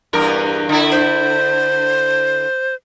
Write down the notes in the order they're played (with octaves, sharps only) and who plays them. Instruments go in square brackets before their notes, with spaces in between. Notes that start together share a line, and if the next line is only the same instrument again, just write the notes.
[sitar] E2 G2 A#4
D3 E4
[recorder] C5